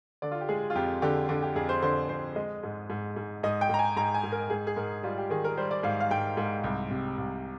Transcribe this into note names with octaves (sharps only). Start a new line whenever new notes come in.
D3 D5
F4
G4
G#3 G#4
F4
F2 G4
D3 G4
D3
G4
F2 G#4
C5
D3 C5
F2 C5
G#3 D#5
G#2
G#2
G#2
G#2 D#5
G5
G#2 A#5
G#5
G#2 A#5
G#5
G#2
A#4
G#2 G#4
G#4
G#2 A#4
G3 F4
G4
D#3 G#4
A#4
G3 C5
D5
G#2 F5
F5
G#2 G5
G#2
C2
C3
C2